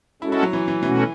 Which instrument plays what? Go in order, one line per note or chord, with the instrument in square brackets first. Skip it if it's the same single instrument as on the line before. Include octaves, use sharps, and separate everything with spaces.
[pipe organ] G#3 C#4 F#4 A4 [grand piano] E4
[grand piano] E4
F#3
E3
E3
[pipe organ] B2 A3 C#4 F#4 [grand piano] E3